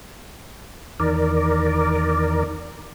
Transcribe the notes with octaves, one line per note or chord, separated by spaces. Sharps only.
E2 D#3 A#4 D5